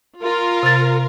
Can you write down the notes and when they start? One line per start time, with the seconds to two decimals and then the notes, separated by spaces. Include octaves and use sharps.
0.20 F4 A#4
0.63 C3 A6